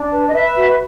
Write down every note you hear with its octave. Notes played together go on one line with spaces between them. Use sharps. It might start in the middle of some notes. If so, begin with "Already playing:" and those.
Already playing: D4
B4
D#5
B4 E5
F#4